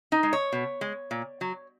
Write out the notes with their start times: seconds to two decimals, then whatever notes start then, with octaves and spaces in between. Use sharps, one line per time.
0.12 D#4
0.23 G#3
0.33 C#5
0.53 B2
0.81 G#3
1.11 A#2
1.41 F#3